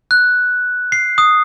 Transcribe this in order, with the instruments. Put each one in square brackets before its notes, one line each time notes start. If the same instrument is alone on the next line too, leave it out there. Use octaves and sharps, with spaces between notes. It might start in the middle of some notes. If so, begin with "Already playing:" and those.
[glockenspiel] F#6
C7
D#6